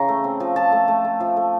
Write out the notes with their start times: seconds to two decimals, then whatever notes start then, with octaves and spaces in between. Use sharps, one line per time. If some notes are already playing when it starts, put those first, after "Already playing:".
Already playing: C#3 E3 A#5 B5
0.08 A3
0.24 C4
0.40 F3
0.56 F3 A5
0.72 A3
0.88 A3
1.05 A3
1.20 F3
1.37 A3